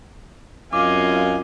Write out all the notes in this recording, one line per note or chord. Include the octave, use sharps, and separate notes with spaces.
F#2 C4 F4 D#5 F5 G#5 D6